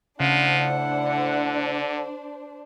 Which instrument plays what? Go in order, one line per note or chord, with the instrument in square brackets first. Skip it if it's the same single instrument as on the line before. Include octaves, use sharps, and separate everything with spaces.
[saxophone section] A2 E4 F#5 [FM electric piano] C#3 [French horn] F3 [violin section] D4 C5
[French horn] D3